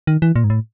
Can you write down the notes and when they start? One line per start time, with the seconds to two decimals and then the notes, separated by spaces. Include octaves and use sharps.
0.07 D#3
0.22 E3
0.36 A#2
0.44 G#2
0.50 A2